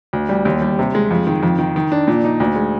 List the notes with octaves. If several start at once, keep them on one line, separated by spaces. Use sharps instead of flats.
D2
G3
D#2
G3
C3
G#3
F2
D#3
F2
D#3
D#3
D4
A#2
D#4
D2
G#3